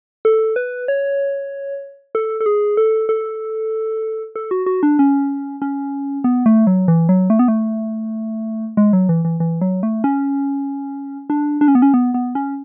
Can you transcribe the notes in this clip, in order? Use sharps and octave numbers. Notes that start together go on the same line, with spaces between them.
A4
B4
C#5
A4
A4
G#4
A4
A4
A4
F#4
F#4
D4
C#4
C#4
B3
A3
F#3
E3
F#3
A3
B3
A3
G#3
F#3
E3
E3
E3
F#3
A3
C#4
D4
D4
C#4
B3
C#4
B3
B3
C#4